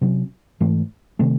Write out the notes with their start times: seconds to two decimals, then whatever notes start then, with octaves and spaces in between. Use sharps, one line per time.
0.01 C3 F#3 C#4
0.60 G#2 E3 A3
1.19 C3 D#3 A3